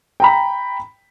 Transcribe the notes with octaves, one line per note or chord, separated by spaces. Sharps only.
G5 A#5 B5